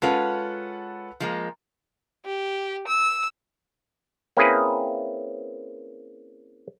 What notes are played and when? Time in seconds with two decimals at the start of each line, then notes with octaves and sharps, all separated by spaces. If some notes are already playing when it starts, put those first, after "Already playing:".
0.02 G#3 C#4 F4 A4 B4 F#5
1.20 F3 G#3 A#3
2.25 G4
2.88 E6
4.37 A#3 C4 C#4 E4 G#4 B4